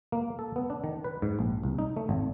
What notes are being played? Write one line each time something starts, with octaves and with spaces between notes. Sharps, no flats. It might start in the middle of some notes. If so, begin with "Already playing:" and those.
A#3
A4
B3
D4
D#3
B4
G#2
A#1
C2
D#4
A3
G#1